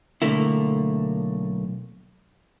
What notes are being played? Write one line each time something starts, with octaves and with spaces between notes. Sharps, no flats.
B1 D3 A3 A#3 E4